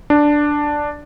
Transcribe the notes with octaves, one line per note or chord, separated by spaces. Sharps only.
D4